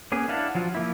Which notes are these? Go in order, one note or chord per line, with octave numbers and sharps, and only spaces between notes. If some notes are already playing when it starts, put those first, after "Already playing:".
A#3 B3 C#4 G#4
D4 E4 F5 F#5 A5
F3 F#3 F4
F3 A#3 E4